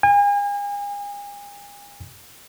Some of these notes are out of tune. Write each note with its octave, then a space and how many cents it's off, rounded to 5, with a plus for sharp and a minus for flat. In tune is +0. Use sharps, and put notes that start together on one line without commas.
G#5 -40